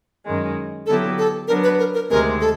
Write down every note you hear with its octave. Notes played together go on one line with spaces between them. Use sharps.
F#2 D#3 G#3
D3 F#3 B3 E4 G4 A4
A4
F#3 B3 D4 A#4
B4
A#4
A#4
D2 C3 D#3 G#3 A#4
A4